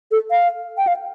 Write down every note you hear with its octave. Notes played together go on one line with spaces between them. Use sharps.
A4
F5
G5
F5